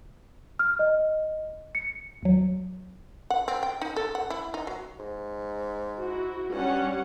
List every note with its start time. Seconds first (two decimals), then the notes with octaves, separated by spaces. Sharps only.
0.59 F6
0.79 D#5
1.75 C#7
2.22 D#2 F#3
3.30 F#5
3.48 C4
3.63 G5
3.81 D#4
3.96 A4
4.15 F#5
4.30 E4
4.54 D#4
4.67 F#3
4.99 G#2
5.99 E4 F#4
6.52 G2 G3 C#4 F#5